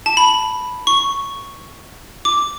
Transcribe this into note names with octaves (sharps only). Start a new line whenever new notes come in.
A5
B5
C#6
D6